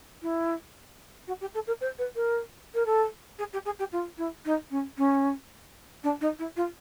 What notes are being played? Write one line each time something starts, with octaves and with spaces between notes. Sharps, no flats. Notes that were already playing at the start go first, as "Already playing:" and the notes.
E4
F#4
G4
A4
A#4
C5
B4
A#4
A#4
A4
G#4
G4
G#4
G4
F4
E4
D#4
C#4
C#4
D4
D#4
E4
F4